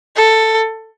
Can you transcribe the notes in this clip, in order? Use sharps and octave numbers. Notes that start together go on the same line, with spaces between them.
A4